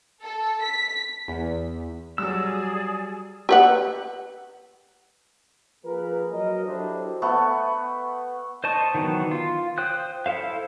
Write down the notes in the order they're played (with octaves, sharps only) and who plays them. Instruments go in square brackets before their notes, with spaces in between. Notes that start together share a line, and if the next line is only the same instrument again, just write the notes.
[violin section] A4
B6
[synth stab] E2
[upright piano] F#3 G3 [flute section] G#4 D5 [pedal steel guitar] E6
[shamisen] G4 B4 F#5
[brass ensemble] F3 A#3 G#4 A#4 B4
F#3 A#4 D#5
F#3 D4 E4 G4 A4 C5
[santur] A3 B3
[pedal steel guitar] C5 D5 D#5 A5 C#6
D#3 E3 F#3 B3
F4
C5 G5 D#6 F#6
E4 A4 C5 F5